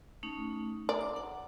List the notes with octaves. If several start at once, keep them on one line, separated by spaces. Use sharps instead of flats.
A3 C#4 D#4
D5 A#5
D6
F#5